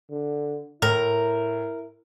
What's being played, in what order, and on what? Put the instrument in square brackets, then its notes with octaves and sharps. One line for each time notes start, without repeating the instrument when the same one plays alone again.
[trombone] D3
[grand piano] A2 [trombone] E4 [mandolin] A#4